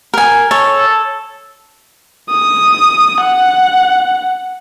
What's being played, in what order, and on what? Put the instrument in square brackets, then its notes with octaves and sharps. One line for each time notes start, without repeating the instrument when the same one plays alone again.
[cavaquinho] A#4 G#5
[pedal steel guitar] A4 [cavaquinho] C#5
[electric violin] D#6
F#5